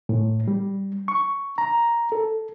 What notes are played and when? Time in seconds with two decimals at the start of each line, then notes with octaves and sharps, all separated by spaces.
0.09 A2
0.48 G3
1.08 C#6
1.58 A#5
2.12 A4